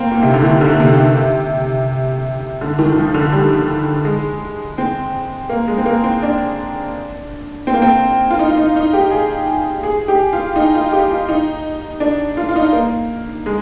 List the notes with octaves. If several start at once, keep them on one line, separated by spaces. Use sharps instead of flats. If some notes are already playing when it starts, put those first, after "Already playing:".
Already playing: A#3 C4
A#2
C3
D3
D#3
D3
C3
C3
D3
D#3
D#3
F3
D3
G3
G#3
C4
A#3
G#3
C4
A#3
C4
D4
C4
A#3
C4
F4
D#4
F4
D#4
D#4
G4
G#4
G#4
G4
F4
D#4
F4
G4
F4
D#4
D4
F4
F4
D#4
A#3
G#3